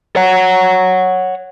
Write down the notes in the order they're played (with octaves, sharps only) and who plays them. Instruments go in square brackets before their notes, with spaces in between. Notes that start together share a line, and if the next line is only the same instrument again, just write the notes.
[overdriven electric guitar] C#5 F#5